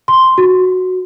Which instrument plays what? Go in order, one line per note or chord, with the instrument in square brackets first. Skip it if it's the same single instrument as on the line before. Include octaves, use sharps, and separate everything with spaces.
[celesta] C6
F#4